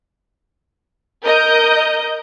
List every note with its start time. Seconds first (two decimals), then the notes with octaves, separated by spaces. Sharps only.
1.25 A#4 D#5 G6